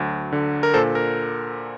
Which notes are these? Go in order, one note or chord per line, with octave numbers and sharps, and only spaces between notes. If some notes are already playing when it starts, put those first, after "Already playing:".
Already playing: D2 F#3
D3
A#4
A#2 A4 C5
A#4